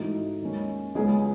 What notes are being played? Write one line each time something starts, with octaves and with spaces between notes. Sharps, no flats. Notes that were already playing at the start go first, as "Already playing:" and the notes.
Already playing: G#2 E3 A3 D#4 F#4
D#2 D#3 G#3 C#4
C#2 C#3 G#3 B3 G#4